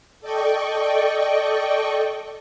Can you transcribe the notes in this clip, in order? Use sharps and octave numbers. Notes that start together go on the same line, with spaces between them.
A4 D5 D#5 G5 C#6